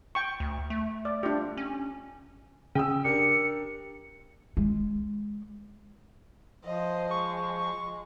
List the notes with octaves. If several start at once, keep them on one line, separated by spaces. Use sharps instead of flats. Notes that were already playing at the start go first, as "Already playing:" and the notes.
G5 C#6
D2
A3
D5
D4 F4 G4
C#4
C#3 G5 D#6 E6
D4 G4 A#4 C#7
G#3
F3 C5 D#5
G#3 C#6